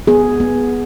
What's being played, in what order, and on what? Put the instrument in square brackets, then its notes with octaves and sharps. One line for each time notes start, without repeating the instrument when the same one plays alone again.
[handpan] B3 G#4
B3